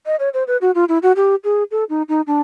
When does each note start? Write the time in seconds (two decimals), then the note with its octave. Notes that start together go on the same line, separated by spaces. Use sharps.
0.06 D#5
0.19 C#5
0.34 C5
0.47 B4
0.61 F#4
0.75 F4
0.89 E4
1.03 F#4
1.16 G4
1.44 G#4
1.71 A4
1.90 D#4
2.09 D#4
2.27 D4